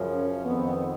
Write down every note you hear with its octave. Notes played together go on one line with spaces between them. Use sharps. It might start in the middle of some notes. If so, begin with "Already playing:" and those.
Already playing: F#2 C#3 F3
C#4
F2 D#3 B3